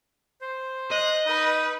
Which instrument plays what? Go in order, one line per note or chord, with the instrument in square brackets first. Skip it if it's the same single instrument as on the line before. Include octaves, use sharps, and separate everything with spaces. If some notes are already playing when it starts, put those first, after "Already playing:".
[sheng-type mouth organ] C5
[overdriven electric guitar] D#5 [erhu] F#6
[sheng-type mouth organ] D#4 D#6 [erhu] B4